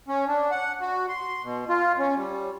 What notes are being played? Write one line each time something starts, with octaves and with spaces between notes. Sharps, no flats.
C#4
D4
F#5
F#4
C6
B2
F4
C#4
G3